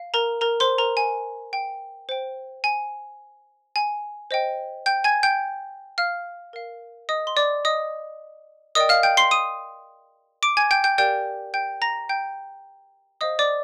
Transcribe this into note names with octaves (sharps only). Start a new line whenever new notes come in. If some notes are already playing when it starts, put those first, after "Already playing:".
Already playing: F5
A#4 A#5
A#4 A#5
C5 C6
A#4 A#5
G#5
G5
C5 G5
G#5
G#5
C5 D#5 G5
G5 G6
G#5 G#6
G5 G6
F5 F6
A#4 F5
D#5 D#6
C6
D5 D6
D#5 D#6
A#4 D5 D#5 G5 D#6
F5 F6
G5 G6
C6 C7
D#6 D#7
D6 D7
G#5 G#6
G5 G6
G5 G6
G4 A#4 D5 F5 G5 G6
G5 G6
A#5 A#6
G5 G6
C5 D#5 F5 D#6
D5 D6